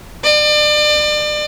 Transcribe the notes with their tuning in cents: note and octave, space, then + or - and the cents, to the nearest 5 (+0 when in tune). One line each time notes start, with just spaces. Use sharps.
D5 +35